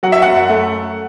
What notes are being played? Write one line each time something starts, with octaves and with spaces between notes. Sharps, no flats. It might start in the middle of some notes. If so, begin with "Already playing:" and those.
F#3 F#5
E5
F#2 F#5
A3